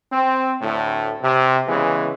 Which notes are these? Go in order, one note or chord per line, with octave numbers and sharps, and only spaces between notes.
C4
D2 A2
C3
C#3 E3 G#3 B3